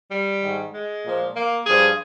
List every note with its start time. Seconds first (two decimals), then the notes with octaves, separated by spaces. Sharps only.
0.11 G3
0.42 G#2 D#3
0.73 G#3
1.04 A#2 F3
1.35 A#3
1.66 G2 F3 G#4